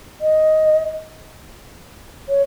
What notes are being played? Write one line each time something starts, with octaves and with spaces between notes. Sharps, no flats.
D#5
C#5